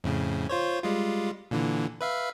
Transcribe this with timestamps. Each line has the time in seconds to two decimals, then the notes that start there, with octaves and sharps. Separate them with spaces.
0.04 F2 A2 C#3
0.49 F4 C5 C#5
0.83 G3 G#3 F4
1.51 A#2 D3 E3
2.01 B4 E5 F5